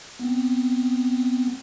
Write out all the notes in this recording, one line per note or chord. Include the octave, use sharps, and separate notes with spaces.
B3 C4